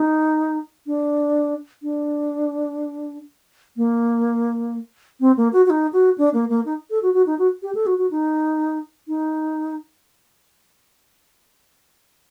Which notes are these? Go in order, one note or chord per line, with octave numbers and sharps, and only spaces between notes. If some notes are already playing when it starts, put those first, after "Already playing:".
Already playing: D#4
D4
D4
A#3
C4
A#3
F#4
F#4
D#4
F#4
D4
A#3
A#3
D#4
A4
F#4
F#4
D#4
F#4
G4
A4
F#4
F#4
D#4
D#4